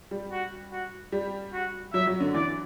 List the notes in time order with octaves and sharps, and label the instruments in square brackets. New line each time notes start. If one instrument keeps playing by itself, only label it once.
[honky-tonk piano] G3
[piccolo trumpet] F#4
F#4
[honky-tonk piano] G3
[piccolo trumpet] F#4
[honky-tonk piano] F#3 [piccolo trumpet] E5
[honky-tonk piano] F#3
D3
[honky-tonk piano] E3 [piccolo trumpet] D5